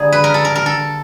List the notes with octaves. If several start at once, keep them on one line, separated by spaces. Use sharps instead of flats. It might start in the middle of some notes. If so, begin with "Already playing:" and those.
Already playing: D3 G3 A#3 G#4
B4
A#4
A4
A#4
A#4
A4